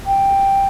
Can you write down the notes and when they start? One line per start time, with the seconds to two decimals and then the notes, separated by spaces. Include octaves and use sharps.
0.07 G5